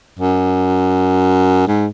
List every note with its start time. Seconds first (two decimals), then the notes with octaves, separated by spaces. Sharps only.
0.19 F#2
1.67 G#2